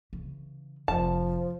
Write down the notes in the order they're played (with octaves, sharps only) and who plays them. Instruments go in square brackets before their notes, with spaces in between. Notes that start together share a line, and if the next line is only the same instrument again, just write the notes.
[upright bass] C#3 E3
[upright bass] F1 [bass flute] F3 [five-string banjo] A5